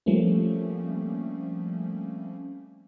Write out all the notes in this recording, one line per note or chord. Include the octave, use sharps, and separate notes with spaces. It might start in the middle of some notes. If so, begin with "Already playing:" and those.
F3 G3 A3 A#3 C4 C#4